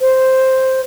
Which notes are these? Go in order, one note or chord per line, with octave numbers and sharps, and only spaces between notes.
C5